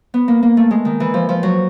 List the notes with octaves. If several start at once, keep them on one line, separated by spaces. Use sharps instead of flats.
B3
A#3
A#3
A3
G#3
D#3
E3
F3
F3
F#3